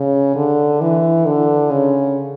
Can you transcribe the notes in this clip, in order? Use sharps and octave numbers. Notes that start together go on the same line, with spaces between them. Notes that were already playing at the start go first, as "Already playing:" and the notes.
Already playing: C#3
D3
E3
D3
C#3